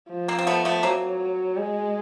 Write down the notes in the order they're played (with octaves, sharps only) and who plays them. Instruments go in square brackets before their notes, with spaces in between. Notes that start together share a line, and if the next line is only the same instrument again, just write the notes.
[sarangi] F3
[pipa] A#3 C4
C4
A3 B3
A3 B3
[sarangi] F#3 [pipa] A#3 C4
[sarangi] G#3